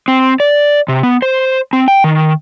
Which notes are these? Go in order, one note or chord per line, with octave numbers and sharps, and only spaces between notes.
C4
D5
C3
B3
C5
C4
G5
D#3